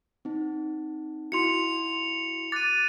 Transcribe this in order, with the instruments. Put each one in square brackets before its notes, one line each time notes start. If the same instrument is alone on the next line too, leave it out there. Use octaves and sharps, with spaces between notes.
[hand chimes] C4 D#4
[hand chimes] E4 F#4 C6 [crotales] C#7 F7
[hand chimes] D6 F#6 [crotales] A6 D#7